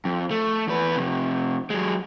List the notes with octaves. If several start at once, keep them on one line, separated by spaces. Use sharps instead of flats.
F2
A3
E2 B4
F2 C3
F#3 G#3